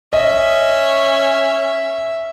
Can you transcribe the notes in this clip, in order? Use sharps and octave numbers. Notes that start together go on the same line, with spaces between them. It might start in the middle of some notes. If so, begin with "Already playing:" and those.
C#4 D#5 E5